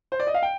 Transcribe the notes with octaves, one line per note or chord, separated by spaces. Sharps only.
C5
D5
D#5
F5
G5